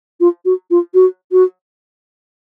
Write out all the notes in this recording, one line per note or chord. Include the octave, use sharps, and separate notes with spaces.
F4
F#4
F4
F#4
F#4